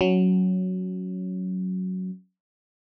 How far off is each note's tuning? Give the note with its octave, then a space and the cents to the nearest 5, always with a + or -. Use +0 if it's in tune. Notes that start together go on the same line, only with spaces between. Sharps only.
F#3 +0 C#4 +0